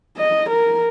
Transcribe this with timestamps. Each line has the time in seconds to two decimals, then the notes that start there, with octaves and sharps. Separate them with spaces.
0.17 D#5
0.49 A#4